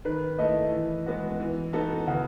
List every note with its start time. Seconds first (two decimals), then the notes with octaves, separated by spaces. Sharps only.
0.05 D#3 B4
0.39 A3 E4 D#5
0.72 E3
1.06 G#3 B3 F#4
1.40 E3
1.73 B3 D#4 F#4 A4
2.07 C#3 F#5